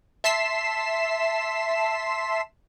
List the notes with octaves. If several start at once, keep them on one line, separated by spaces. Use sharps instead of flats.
E5 A5 C6 B6 C7 E7